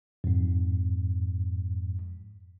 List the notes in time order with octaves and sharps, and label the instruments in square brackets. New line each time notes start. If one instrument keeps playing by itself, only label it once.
[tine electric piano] F2 G#2